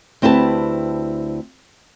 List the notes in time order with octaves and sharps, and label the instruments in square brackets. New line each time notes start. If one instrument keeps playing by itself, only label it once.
[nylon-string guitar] D2 C4 E4 G4 B4 A5